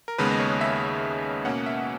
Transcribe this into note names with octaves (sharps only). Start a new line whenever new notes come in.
A#4
D#2 C#3 G#3 B3 B4
D#5
C#5
E5
B2 A#3 C#4 F#5
E5